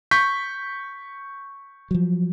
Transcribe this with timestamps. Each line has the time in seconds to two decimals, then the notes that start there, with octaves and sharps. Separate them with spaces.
0.11 C#6 G6 B6
1.91 F3 F#3